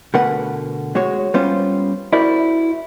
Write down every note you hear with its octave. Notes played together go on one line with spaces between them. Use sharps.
B2 D3 A3 A#4 B4 F#5
G#3 F#4 C#5
G3 B3 C#4 F4 C5
E4 F#4 A#4 C5 D5 E5